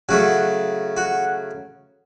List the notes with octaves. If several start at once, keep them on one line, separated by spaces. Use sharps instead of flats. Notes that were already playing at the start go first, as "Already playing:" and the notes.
C#3 F#3 A3 F#4
F#4